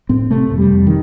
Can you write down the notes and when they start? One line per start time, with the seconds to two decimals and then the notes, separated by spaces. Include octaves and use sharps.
0.09 A2 C4
0.31 C3 A3
0.51 F2
0.58 G3
0.73 F2
0.87 D#3